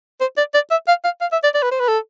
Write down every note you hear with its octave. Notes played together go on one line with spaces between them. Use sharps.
C5
D5
D5
E5
F5
F5
F5
E5
D5
D5
B4
C5
B4
A4